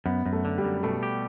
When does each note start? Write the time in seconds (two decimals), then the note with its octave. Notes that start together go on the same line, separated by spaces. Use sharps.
0.05 F#2 B3
0.26 F#2
0.33 A3
0.45 D3
0.58 G3
0.64 F#2
0.83 B2 A3
1.03 G4